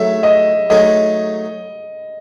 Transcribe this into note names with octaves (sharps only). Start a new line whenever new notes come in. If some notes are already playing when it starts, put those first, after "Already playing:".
Already playing: F#3 A3 D#4 G#4 E5
D#5
F#3 A3 D#4 G#4 D#5